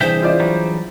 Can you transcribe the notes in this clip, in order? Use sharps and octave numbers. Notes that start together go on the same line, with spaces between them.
C2 E3 D4 G#4 C5 E5 G5
E4 F4 D5
F#3 G3